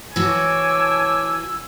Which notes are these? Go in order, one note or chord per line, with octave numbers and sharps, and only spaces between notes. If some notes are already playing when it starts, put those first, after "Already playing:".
E3 F#4 C#5 G#5 A5 D6 E6